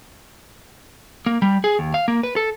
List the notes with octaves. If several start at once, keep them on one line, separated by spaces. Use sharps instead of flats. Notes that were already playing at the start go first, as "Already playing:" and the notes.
A#3
G3
G#4
D#2
F5
A#3
B4
A4